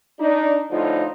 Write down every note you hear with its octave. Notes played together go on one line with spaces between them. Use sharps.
D4 D#4
A2 D3 F3 D#4 F4